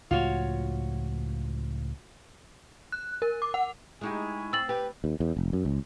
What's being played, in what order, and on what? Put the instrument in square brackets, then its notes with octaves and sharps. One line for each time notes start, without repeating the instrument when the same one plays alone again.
[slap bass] C#2 A2 F3 [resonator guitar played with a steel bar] F4 F#4 C#5
[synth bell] F#6
A#4
D6
F#5
[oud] G#3 D#4 G4 [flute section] E4 G#5 C#6
[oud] C4 [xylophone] E6 A6 F#7
[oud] G4 [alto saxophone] B4
[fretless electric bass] D#2
E2
F1
F#2
C#2